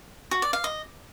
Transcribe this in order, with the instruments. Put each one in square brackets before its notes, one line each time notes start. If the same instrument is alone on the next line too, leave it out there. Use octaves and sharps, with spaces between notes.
[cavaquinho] F#4
D5
F5
D#5